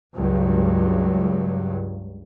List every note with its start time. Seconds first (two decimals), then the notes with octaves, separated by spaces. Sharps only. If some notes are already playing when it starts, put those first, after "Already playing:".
0.14 C#2 G2 F#3